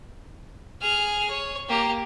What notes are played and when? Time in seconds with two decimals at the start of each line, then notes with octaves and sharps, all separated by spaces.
0.81 G#4 F6
1.30 C#5
1.69 A#3 G4